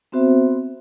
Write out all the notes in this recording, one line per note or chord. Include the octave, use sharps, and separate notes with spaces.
B3 C4 F#4 C5 E5